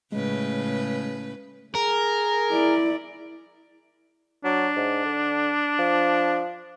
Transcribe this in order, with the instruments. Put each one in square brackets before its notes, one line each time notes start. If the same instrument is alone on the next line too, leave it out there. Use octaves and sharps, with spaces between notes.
[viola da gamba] A2 C#3 B4 [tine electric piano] G#3
[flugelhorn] G#4 [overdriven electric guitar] A#4
[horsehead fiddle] E4 D5
[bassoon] F#3 [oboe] D4
[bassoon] G#2
D3
F3